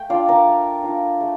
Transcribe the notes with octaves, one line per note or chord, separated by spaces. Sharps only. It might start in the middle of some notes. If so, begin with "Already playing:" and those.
Already playing: A3 G5
D4 F4 D5 F5
A#4 D5
A3
D4 F4
A3